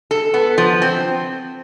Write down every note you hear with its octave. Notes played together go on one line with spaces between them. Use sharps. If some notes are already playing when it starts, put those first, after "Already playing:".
A4
B3
F3
C4